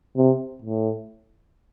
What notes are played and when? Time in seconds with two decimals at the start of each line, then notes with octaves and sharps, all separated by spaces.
0.17 C3
0.62 A2